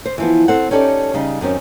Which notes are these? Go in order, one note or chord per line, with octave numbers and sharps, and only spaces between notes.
C5
E3 F3 B3
C4 A4 F#5
C#4 D#4 G4 A4 D5
C#3 G3 D#4
F#2 D#3 C4 C#4